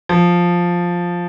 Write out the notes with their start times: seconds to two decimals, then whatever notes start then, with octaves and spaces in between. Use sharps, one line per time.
0.09 F3